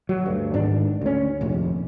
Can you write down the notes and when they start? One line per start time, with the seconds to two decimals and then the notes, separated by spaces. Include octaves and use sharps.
0.09 F#3
0.26 D2 G2
0.54 G#2 D#3 D4
1.01 D2 C#4
1.41 F1 A#1 D#2